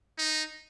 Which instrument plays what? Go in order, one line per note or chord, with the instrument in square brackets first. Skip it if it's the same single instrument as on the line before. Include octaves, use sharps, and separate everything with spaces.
[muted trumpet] D#4